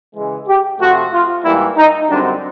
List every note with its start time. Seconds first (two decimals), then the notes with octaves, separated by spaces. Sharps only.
0.15 C#3 E3 G#3
0.47 G4
0.80 C3 F3 A3 F#4
1.12 F4
1.44 G#2 E3 G3 A#3 E4
1.77 D#4
2.09 F#2 D3 G3 C4 D4